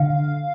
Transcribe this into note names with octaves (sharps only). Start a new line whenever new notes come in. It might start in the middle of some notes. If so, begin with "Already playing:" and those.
Already playing: D3 F5